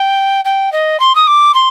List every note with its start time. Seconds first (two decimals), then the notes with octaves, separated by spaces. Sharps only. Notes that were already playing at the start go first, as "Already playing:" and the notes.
Already playing: G5
0.44 G5
0.72 D#5
0.99 C6
1.15 D#6
1.27 D6
1.54 C6